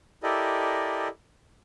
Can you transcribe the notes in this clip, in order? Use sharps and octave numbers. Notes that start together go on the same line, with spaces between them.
E4 G4 A4 A#4 D5 D#5